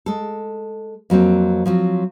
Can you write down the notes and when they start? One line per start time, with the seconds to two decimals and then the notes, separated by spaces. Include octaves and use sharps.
0.06 G#3 A4
1.10 F2 F#3 A#3 C4
1.66 F3 F#3 C4